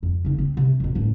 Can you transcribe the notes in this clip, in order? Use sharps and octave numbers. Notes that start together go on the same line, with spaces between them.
F2
C#3 D#4
C4
C3
F2 B2
F#2 A2